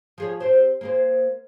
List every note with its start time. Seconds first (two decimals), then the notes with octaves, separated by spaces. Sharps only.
0.18 F3 G#4 C#5
0.40 C4 G4 C5
0.81 A#3 G#4 C5